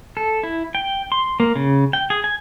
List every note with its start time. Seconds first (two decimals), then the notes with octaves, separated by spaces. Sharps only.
0.17 A4
0.43 E4
0.75 G5
1.12 C6
1.40 A#3
1.56 C#3
1.93 G5
2.10 G#4
2.24 G#5